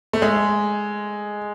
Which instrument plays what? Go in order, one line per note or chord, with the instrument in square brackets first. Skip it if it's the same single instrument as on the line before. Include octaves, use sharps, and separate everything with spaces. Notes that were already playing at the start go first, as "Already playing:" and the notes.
[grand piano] A3
G#3